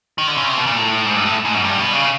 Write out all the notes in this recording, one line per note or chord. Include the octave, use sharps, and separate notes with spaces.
D#3
D3
C#3
C3
B2
A#2
A2
G#2
G2
A2
G#2
F#2
G2
B2
C#3